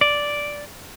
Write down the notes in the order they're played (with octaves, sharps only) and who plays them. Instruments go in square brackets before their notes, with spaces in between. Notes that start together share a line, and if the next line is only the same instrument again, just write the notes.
[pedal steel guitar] D5